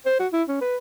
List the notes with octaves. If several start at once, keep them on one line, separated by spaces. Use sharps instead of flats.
C5
F#4
E4
C#4
B4